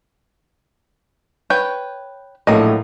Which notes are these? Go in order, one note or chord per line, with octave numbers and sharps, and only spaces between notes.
B4 C#5 G5
A#1 A2 F#3 A3 A#3 D#5